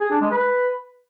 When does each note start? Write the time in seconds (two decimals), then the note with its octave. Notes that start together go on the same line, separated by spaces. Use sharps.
0.01 G#4
0.11 D4
0.21 G#3
0.31 B4